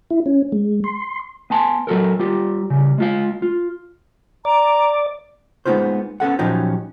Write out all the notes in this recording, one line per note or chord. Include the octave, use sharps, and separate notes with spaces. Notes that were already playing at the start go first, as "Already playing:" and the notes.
E4
C#4
G#3
C6
B3 G#5 A5 C6
F#3 F#4 A4 A#4
G3 F4 G4
C#3 G3
G#3 F4 F5
F4
D5 A#5
G#3 A#3 B3 D#4 F4 C5
B3 C#4 A4 F#5
A#2 F3 F#3 C#4 D#4 G4